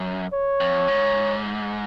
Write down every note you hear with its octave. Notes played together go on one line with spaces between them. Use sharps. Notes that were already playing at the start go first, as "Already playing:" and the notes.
Already playing: F#2
C#5
F2
G#2